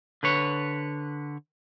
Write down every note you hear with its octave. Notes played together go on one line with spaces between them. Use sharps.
D3 B4 C#5